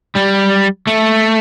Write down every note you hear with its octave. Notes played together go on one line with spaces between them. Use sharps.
G3
A3